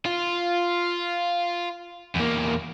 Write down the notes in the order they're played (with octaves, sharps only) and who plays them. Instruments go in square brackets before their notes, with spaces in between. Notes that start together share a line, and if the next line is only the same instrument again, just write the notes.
[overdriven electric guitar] F4
E2 A#3